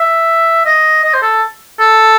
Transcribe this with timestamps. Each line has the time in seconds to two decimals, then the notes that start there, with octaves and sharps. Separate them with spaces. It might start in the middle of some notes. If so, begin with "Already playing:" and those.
Already playing: E5
0.65 D#5
1.03 D#5
1.14 C5
1.22 A4
1.80 A4